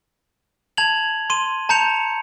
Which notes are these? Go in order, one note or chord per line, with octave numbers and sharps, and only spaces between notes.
A5 G#6 F7 F#7
C6 D#7
A5 A#5 G6 C#7 F7